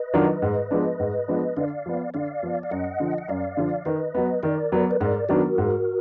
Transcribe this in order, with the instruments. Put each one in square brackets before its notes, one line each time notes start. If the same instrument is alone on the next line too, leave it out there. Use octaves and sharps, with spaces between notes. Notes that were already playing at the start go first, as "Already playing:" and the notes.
Already playing: [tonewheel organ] B4 D#5
[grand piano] D#3 F#3 D4 F4
G#2
F3 G#3 B3 D4
G#2
F3 G#3 B3 D4
[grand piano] D3 [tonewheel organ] D5 F5
[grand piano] F3 B3
[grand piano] D3 [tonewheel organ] D5 F5
[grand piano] F3 B3
[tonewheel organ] F5
[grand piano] F#2 [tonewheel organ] D#5 F#5
[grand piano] D3 F3
[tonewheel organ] F#5
[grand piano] F#2 [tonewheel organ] D5 F5
[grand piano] D3 F3
[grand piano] D#3 [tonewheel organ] B4 D#5
[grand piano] F#3 B3
[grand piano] D#3 [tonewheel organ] A#4 D5
[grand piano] F#3 B3
[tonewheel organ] B4
[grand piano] G#2 [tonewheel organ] A#4 D5
[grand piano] D#3 F#3 B3 D4 [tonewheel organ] F#4 A#4
[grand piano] G#2